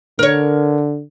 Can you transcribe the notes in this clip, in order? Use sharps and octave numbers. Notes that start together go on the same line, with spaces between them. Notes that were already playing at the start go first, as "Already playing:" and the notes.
D3 A#4 C#5